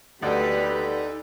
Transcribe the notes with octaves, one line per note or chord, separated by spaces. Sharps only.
D2 D#4 G4 A4 B4 D5 A6